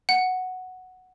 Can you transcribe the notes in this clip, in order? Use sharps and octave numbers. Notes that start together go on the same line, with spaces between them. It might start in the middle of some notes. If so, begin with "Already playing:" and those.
F#5